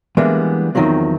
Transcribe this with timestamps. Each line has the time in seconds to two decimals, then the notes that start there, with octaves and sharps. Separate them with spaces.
0.17 E3 G3 G#3 A#3 B3 D4
0.75 E2 A2 D#3 F3 F#3 C4